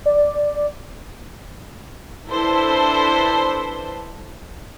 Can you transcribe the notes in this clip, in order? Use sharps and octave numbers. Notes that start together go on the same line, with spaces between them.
D5
D4 E4 A4 B4 C5